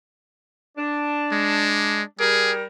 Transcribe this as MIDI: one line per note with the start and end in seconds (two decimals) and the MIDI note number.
0.77 2.01 62
1.32 2.02 56
2.20 2.64 55
2.20 2.52 68
2.20 2.64 70